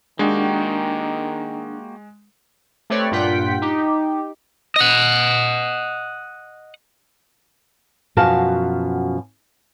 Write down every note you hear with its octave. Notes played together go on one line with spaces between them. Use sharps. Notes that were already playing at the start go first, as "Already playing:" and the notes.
D#3 G#3 A#3 D4 F#4 G4
A3 C4 G4 B4 C#5 D5
G2 A#2 F4 F#5 G5 B6
D#4 G4
D#5 F#5
F#2 B2 F3 F#4 F5 A5